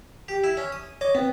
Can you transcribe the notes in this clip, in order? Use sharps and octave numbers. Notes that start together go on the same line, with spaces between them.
G4
E4
C#4
D#6
C#5 D#5 D6
B3 C4